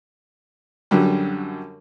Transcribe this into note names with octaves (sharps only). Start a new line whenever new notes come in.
F#2 D3 F#3 G3